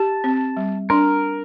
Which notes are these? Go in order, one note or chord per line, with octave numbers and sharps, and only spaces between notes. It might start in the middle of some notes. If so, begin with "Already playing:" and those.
Already playing: G4 A5
C4
G3
D4 A#4